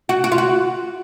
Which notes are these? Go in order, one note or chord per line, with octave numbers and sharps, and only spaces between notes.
F#4
F#4
F4
F#4